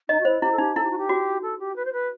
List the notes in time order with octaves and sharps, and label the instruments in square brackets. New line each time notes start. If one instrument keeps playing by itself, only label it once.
[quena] D#4 [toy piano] D#5
[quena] F#4
[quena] E4 [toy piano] C5
[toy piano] E4 [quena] G4
[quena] A4
[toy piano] D#4 [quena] G4
[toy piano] E4 [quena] A4
[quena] G4
F#4
G4
[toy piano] F#4
[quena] A4
G4
B4
C5
B4